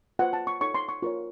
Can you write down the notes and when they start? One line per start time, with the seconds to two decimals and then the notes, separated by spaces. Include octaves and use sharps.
0.19 F4 C5 F#5
0.33 A5
0.47 C#6
0.61 D#4 A4 C#5 C#6
0.75 C6
0.89 C#6
1.02 F4 A#4 C#5 C#6